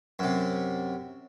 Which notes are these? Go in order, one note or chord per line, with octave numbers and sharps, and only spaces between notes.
F#2 C3